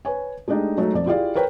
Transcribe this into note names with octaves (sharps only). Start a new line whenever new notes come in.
B4 C#5 G#5
G#3 A3 D4 D#4 G4
F#3 G#3 A3 D#4
F2 D5
E4 F4 G4 G#4 D5 F5
A#4 B4 C#5 G5